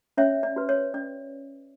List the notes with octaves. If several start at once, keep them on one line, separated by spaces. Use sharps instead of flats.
C#4 C#5 E5
D5
F#4 B4
C#5
C#4 D5